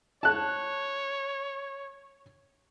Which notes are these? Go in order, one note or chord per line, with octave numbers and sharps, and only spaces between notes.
C#5 A5 F#6